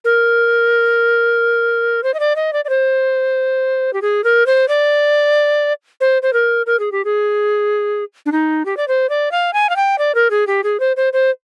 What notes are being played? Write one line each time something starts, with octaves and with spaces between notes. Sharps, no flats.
A#4
C5
D#5
D5
D#5
D5
D5
C5
G4
G#4
A#4
C5
D5
C5
C5
A#4
A#4
G#4
G4
G#4
D4
D#4
G4
D5
C5
D5
F5
G#5
F5
G5
D5
A#4
G#4
G4
G#4
C5
C5
C5